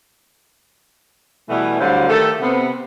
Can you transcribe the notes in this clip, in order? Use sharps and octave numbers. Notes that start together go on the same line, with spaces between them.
B2 E3 G3 A3 B3 E4
D2 D3 F#3 G3 C5 F5
D#3 A3 G4 A4
C3 B3